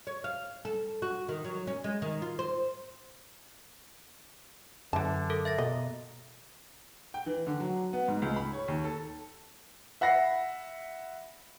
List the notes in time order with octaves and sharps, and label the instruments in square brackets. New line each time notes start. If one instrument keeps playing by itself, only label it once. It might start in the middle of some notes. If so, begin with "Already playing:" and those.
[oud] C#5
F5
A4
F#4
D#3
F#3
C#4
G#3
D#3
F4
C5
[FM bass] F#2 [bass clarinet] D3 [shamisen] E3 A5
[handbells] A4 A#4
E5 A6 A#6
[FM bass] B2 [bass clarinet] A#3 [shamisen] D#5
[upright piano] G5
E3
D3
F#3
B3
G#2
C#2
B5
C#5
D#2
A4
E5 F#5 B5 A#6 C7